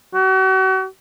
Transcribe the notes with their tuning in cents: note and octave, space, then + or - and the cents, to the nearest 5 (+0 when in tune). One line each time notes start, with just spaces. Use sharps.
F#4 +40